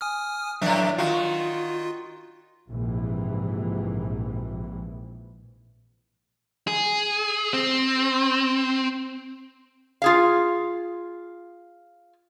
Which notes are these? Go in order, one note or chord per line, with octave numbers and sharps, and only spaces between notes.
G#5 D#6 F6
A2 E3 F#3 D4 E5
D#3 F4 F#4 F5
A#1 G#2 C3 E3
G#4
C4
F4 G#4 F5